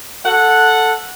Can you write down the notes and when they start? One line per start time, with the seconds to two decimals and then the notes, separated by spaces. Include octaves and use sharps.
0.24 A4 F#5